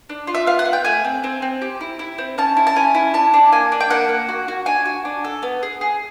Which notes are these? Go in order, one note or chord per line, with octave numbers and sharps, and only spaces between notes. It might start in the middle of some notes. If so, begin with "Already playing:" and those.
D4
F4
E5
B3 F5
F#5
B3
G5
A3 G#5
C4
C4
C4
G4
E4
E4
C4
C#4 A5
E4
A5
C#4 G#5
E4
D4 A5
D4
A#3 G#5
D4
G5
A#3 F#5
A#3
F#4
F#4
D4 G#5
F#4
D4
A4
B3
G#4
G#4